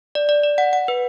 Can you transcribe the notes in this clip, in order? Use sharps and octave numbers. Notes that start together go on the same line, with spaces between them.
D5
D5
D5
F#5
F#5
B4